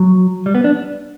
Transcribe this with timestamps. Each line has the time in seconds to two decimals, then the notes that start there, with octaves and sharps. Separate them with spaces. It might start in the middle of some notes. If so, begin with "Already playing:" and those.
Already playing: F#3
0.46 G3
0.55 B3
0.64 D4